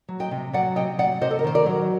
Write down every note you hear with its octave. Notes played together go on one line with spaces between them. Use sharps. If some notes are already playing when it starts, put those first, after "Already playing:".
F#3
D#5 G5
C3
F#3 D5 F#5
C3 D#5 G5
F#3 D5 F#5
C3 C5 D#5
A4
A#4
D#3 C5
A#4 D5
F#3